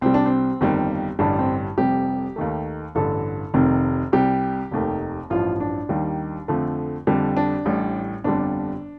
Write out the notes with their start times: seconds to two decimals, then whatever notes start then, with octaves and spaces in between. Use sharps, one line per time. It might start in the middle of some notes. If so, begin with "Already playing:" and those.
0.01 C2 C3 G3 C4
0.14 D4
0.26 C4
0.61 G1 F2 D#3 G3
1.19 A1 G2 D3 G3 D4
1.39 C4
1.78 F1 F2 C3 G3 G4
2.36 D#2 D#3 A3
2.95 A1 G2 D3 A4
3.54 F1 F2 C3 D#3
4.12 C2 C3 G3 G4
4.71 F1 D#2 D#3 A3
5.30 A1 G2 F3 F4
5.60 D4
5.89 D#2 D#3 G3
6.48 F2 D3 F3 A3
7.07 F2 D3 G3
7.37 D4
7.66 A1 A2 G3
8.24 G1 F2 D3 G3 D4